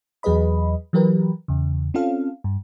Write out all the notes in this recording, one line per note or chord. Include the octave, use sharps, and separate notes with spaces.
E2 F#3 G#4 B4 D#5 B5
E3 F#3 G4 A#4 B4
E2 C#3
C4 C#4 F4 A4 F5
G2